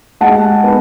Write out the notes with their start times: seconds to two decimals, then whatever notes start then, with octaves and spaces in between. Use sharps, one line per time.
0.21 G#3 F#5 A5
0.64 B3